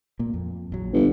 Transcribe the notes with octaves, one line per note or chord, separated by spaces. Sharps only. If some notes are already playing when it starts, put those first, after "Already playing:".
A#2 A#3
F2
A#1 F#3
G1